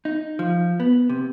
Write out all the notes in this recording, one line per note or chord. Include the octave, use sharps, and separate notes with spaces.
D#4
F3
B3
C3